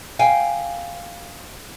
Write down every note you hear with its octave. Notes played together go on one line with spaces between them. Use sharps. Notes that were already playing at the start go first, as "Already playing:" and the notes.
F5 G5 G#5